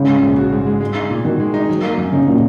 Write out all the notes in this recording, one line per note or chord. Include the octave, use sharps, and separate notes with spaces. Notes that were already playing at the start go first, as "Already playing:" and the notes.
Already playing: G#2 C#3
G#3
A#1
F#4
G#2
G#3
G#3
D#4
A#2
D#3 F#4
G#3
D#4
F#3
A#3
F#2
C#3 D#4
A#2 F#3